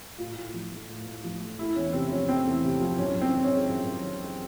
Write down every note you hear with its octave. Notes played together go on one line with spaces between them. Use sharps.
A2 F4
A2
F3
A3
A2
A2
F3
A3
A3 E4
E2 C#4
C3 C4
F3 C#4
A3 C4
E2
C3
F3
F#2 C#4
F#2
C4
D#3
C#4
G#3
F#2
F#2
D#3
G#3